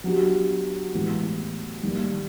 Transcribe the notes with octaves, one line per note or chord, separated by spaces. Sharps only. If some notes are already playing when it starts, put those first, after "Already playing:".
F#3 B3 D4 G4
A2 E3 G#3 B3
D#3 G3 A#3